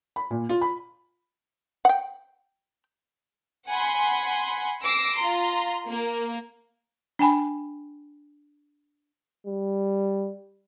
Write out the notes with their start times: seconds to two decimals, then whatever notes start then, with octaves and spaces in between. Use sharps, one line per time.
0.16 B5
0.31 A#2
0.49 F4
0.61 B5
1.85 F#5 G5
3.70 F#5 G#5 B5 C6
4.85 D6 E6 A#6 C7 D7
5.18 F4 A#5 C6
5.89 A#3
7.19 D4 G5 G#5 B5
9.47 G3